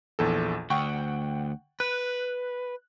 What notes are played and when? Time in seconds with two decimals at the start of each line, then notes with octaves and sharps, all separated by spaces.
0.19 A#1 E2 A4
0.70 D2 F#5 G5 C#6
1.80 B4 F#6